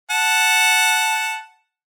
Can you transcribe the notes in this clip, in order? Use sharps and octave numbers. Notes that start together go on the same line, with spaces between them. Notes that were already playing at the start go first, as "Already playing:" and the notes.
F#5 A5